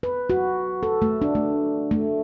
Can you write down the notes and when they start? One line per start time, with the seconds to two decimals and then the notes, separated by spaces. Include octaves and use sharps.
0.03 B4
0.30 F#4
0.83 A4
1.02 A3
1.22 D4
1.35 A3
1.91 A3